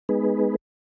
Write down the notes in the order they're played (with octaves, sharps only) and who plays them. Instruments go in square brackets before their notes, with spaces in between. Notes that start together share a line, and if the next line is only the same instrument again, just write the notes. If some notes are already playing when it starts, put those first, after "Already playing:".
[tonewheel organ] G#3 B3 D#4 G#4 B4